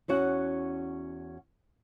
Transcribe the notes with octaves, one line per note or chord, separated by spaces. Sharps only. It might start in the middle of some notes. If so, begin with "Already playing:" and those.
E2 C#4 F#4 F#5